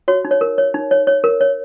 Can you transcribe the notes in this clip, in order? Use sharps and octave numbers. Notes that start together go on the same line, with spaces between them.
F#4 C#5
D#4
C#5
A#4
C#5
D#4
C#5
C#5
A#4
C#5